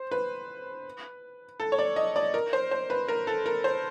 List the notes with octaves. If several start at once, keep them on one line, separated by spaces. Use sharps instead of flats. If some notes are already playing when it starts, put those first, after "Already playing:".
Already playing: C5
B4
A4
C#5
D5
D#5
D5
A#4
C5
C5
B4
A#4
A4
A#4
C5